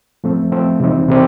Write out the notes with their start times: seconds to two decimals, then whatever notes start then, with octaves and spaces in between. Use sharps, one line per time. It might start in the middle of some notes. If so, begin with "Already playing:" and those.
0.24 F3 A3 C4
0.52 F3 A3 C4
0.80 C3 E3 G3 C4 D#4
1.08 C3 E3 G3 C4